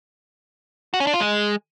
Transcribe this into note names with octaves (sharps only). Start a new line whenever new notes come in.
F#4
C#4
D4
F4
G#3